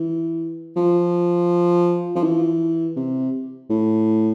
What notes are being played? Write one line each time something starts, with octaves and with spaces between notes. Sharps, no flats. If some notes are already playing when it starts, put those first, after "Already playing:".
Already playing: E3
F3
F3
E3
C3
A2